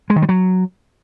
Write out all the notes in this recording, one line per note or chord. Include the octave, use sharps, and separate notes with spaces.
G#3
D#3
G3
F#3